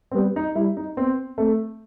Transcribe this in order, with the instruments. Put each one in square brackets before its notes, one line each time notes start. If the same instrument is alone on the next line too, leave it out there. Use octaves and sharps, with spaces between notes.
[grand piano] C4
[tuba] G3 [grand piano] B3
[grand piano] D#4
[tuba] G3 [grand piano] E4
[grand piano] D#4
[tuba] B3 [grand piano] C4
[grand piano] A3 [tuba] C4